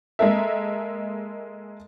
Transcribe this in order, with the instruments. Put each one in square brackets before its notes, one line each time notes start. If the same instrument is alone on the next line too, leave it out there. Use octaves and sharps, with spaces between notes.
[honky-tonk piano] G#3 A#3 A4 A#4 E5